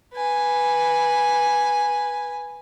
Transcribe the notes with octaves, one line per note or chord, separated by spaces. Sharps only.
B4 G#5